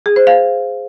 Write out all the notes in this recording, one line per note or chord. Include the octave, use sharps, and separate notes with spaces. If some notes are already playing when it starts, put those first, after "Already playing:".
G#4
C5
F5